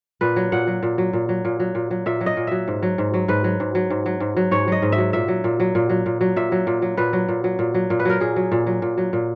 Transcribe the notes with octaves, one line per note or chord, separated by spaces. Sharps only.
A#2 B4
F#3
A#2 F#5
F#3
A#2
F#3
A#2
F#3
A#2
F#3
A#2
F#3
A#2 E5
F#3
D#5
A#2
F#3 E5
G#2
F#3
G#2
F#3
G#2 B4
F#3
G#2
F#3
G#2
F#3
G#2
F#3
G#2 C#5
F#3 D#5
G#2
E5
F#3
A#2 E5
F#3
A#2
F#3
A#2
F#3
A#2
F#3
A#2 E5
F#3
A#2
F#3
A#2 B4
F#3
A#2
F#3
A#2
F#3
A#2
B4
F#3 A#4
A#2 G#4
F#3
A#2
F#3
A#2
F#3
A#2